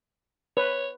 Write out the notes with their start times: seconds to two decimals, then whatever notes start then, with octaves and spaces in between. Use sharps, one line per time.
0.57 B4 C#5